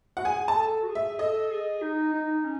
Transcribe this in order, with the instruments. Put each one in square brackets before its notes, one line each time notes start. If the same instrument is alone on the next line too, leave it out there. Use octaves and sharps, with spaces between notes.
[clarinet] F#4 [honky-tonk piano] F#5
[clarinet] G#4 [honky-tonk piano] G#5
[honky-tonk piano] A5
[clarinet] A4
F#4
G#4
[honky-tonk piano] E5
[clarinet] A4 [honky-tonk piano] D#5
[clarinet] G#4
D#4
D#4
C#4